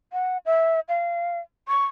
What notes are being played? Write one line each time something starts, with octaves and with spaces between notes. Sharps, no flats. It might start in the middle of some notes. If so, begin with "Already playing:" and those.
F#5
E5
F5
C#6